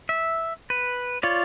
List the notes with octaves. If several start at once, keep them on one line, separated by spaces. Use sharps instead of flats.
E5
B4
F4 C#5 D5